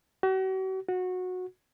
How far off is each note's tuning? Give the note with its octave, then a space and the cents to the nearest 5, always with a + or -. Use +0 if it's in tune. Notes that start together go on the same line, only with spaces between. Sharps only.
F#4 +45
F#4 -15